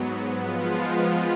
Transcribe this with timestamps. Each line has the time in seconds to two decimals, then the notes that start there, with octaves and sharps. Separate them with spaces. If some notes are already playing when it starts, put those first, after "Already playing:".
Already playing: G#2 F#3 B3
0.38 F3 G#3 B3 F4